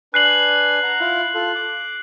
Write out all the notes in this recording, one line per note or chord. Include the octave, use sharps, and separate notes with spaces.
D4 B4 G#5 F#6 C7 F#7
F#5 A#5
E4 F4 F5
F4 A4
D6